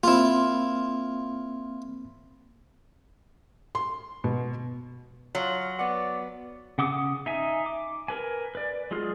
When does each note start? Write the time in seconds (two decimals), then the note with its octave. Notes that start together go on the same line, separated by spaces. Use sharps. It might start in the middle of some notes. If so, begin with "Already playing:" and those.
0.04 A#3 C4 E4 F4
3.75 C6
4.24 B2
5.35 F#3 F4
5.79 B3 D5 F#5
6.78 C#3 F#5 D6 D#6
7.26 D#4 E5 G#5
7.66 D6
8.08 A#4 B4 G#5
8.55 B4 D5
8.91 F#3 G#3 F4 G#4 F6